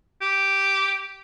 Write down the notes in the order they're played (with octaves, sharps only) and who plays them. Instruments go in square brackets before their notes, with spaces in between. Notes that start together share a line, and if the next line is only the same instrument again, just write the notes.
[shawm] G4